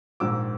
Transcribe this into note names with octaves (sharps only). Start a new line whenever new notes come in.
A#1 G#2 D#3 D6 E6